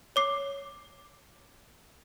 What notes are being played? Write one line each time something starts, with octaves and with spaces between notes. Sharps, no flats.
C#5 D6 C7